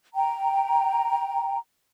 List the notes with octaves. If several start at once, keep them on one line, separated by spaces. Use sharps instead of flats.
G5 A#5